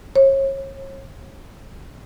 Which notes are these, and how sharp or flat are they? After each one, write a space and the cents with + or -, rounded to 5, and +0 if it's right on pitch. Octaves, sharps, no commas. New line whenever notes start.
C#5 -35